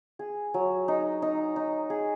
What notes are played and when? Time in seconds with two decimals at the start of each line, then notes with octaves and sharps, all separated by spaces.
0.19 G#4
0.54 F#3
0.88 D#4
1.22 D#4
1.56 D#4
1.90 G#4